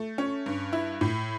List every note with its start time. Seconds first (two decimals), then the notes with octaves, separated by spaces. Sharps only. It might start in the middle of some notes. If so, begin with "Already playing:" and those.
Already playing: A3
0.18 C#4
0.46 G2
0.73 E4
1.01 A2